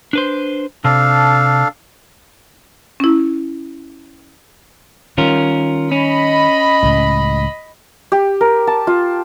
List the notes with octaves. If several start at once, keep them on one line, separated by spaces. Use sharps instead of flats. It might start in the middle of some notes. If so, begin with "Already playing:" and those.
D4 B4 C5
C3 D4 A4 F5
C#4 E4
D#3 G3 C#4 F4 A#4
C#4 D#5 B5
C#2 A2
G4
A#4
A5
F4